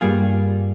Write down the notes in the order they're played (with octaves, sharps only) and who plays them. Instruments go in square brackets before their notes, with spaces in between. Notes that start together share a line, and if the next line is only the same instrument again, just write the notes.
[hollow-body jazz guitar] G2 G3 A#3 F4 G#4